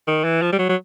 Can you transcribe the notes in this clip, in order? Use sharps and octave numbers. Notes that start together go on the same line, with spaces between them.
D#3
E3
F3
G3
F#3
F#3